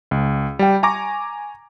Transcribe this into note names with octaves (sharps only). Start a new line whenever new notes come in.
C#2
G3 G5
G#5 A#5 C#6 D6 A#6